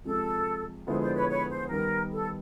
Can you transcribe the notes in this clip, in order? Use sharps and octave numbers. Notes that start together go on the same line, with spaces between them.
C3 F3 G#3 A4
D3 F3 G#3 B3 E4 C5
C5 D5
B4 C#5
B4 C#5
C5
D#3 G3 B3 A#4
A4